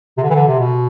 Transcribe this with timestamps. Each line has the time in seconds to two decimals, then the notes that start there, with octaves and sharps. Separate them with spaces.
0.18 C3
0.23 D3
0.30 E3
0.35 D3
0.48 C3
0.60 B2